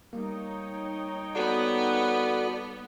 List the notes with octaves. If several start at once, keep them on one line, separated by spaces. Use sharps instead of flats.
G3 A#3 D#4 C#5 G5
B3 F#4 A4 D5